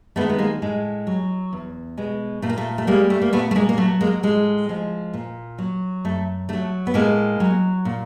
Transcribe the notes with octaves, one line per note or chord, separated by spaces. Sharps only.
G#3 A3 B3
D#3
B3
G#3 A#3
A2 G#3
F#3
E2
B2 G#3
A#2 A3
A#3
A3
A3
G3 G#3 A#3
A3
A#3
A#2 A3 B3
A3
G#3 A#3
A#3
F#3 A3
G#3 A#3
A2 G#3
F3 G#3
A#2
F#3
F#2 A3
D3 F#3 A3
B3
A2 G#3 A#3
F#3
A#2